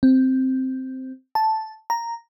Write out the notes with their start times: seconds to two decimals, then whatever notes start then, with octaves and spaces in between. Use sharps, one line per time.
0.03 C4
1.35 A5
1.90 A#5